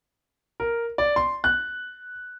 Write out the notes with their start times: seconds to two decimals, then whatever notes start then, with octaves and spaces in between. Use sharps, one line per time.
0.60 A#4
0.98 D5
1.16 C6
1.44 F#6